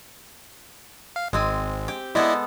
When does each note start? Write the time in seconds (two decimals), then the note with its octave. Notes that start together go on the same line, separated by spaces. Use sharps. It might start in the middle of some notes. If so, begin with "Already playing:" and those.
1.16 F5
1.33 G#1 G#3 C4 G#5
1.88 G4
2.15 G#3 B3 E4 A4 D5 D#5